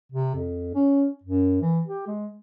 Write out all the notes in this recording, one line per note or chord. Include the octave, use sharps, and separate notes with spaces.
C3
F2
C#4
F#2
E3
G4
G#3